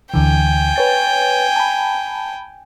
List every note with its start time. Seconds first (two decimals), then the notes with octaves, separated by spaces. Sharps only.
0.14 D2 D3 E3 G5 G#5
0.76 B4 C#5 A6
1.56 A5 B5